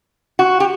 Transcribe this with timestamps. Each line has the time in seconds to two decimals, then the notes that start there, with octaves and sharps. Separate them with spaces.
0.39 F#4
0.60 G4